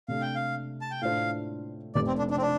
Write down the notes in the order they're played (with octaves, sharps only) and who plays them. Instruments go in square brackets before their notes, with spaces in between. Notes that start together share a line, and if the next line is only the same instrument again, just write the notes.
[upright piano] C3 A3 D4 [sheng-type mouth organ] F5
[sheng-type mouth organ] G5
F5
A5
G5
[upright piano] A2 A3 D4 F4 C5 [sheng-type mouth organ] F5
[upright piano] F1 F2 C3 [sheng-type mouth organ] D5
[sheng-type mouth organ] C4
D4
D4
C4
D4